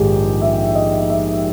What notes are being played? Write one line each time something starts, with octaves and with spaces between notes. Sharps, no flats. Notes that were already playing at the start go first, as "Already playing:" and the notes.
Already playing: A#1 G#2 D#3 G4 G#4
E5
D#5
E5